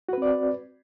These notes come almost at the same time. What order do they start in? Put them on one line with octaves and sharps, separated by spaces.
F#4 B4 C4 D5